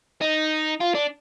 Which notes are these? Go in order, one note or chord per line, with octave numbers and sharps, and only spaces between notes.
D#4
F4
D4